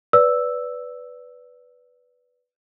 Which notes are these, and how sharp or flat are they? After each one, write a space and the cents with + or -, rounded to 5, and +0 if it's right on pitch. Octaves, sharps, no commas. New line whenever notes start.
B4 +0 D5 -20 E6 +0